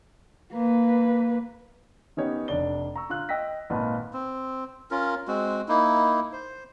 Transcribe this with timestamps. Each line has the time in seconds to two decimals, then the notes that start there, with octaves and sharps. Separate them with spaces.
0.53 A#3 B4
2.17 D#3 B3 C#4 D#4 G4 C#5
2.48 F1 D4 D5 G7
2.96 A#5 C#6 E6
3.09 D3 F4 F#6
3.29 D#5 G5 E6 A#6 B6
3.70 G#1 A#2 F4 B4 D#5 A5
4.13 C4
4.91 C#4 F4 A#4
5.28 G#3 C4 F#4
5.68 A#3 D#4 E4
6.33 C5